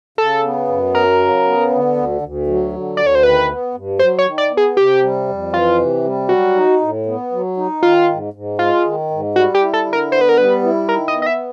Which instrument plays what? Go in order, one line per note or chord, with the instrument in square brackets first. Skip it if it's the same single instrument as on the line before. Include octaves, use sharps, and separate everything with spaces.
[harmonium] C#3 [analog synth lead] A4
[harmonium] B3
F#2
[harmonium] F#3 [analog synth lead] A#4
[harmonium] C#3
B3
D3
D2
D2
F#3
D3
[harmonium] D2 [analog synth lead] D5
[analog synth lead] C#5
C5
[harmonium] D#3 [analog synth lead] B4
[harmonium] B3
G2
[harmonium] F#3 [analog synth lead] C5
[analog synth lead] C#5
[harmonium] D#3
[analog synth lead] D5
[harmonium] B3
[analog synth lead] G#4
[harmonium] C3 [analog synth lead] G4
[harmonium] G3
F2
[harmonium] E3 [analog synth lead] F4
[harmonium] C3
G3
[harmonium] F#3 [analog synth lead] F#4
[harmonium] D#4
A2
B3
F#3
D#4
[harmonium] D#3 [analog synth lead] F4
[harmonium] G#2
G#2
[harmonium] G#3 [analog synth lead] F4
[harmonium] D#3
G#2
[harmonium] G3 [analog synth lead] F#4
[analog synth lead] G4
[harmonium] E4
[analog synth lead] A4
[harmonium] D3
[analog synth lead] A#4
[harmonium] B3 [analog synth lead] C5
[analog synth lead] B4
A#4
[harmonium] G3 [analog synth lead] B4
[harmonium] E4
[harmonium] D#3 [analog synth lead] A#4
[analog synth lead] D#5
[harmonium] B3
[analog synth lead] D#5
E5